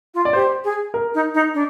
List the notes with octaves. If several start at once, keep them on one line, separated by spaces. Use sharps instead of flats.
F4
D5
G4 C5
G#4
A#4
D#4
D#4
D4